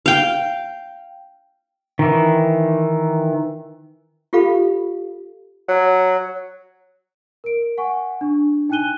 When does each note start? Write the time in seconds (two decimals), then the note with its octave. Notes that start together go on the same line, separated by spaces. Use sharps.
0.06 F5 G5
1.99 D#3 E3
4.33 F4 G4 A4 F5 B5
5.68 F#3
7.44 A#4 D7
7.78 F#5 G#5 C#6
8.21 D4
8.69 D#4 G5 G#5 F#6 D#7 G7